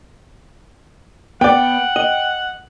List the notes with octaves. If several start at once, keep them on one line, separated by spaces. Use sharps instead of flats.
B3 D5 F#5 G5
D#5